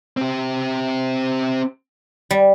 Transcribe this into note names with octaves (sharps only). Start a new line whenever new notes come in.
C4 G4
G3